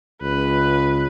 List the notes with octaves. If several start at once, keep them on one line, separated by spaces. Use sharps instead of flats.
C#2 B4